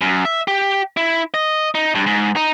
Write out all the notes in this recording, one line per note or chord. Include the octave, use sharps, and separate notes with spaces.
F#2
E5
G4
E4
D#5
D#4
G2
G#2
D#4